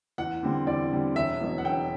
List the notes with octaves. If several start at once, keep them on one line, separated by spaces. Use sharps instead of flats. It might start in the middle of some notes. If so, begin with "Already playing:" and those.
E2 F#5
D3 G3 C4
E2 D5
D3 G3 C4
E1 E5
E2 B2 F#3
F#5
E1 G5